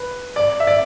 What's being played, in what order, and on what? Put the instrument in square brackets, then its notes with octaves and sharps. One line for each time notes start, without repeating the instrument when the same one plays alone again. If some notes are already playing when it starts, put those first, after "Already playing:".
Already playing: [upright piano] B4
D5
E5
D5